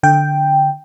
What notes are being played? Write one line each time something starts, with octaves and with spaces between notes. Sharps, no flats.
D3 G5